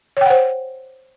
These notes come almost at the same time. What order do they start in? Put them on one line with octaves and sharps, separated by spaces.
C#5 G5 F#5 C5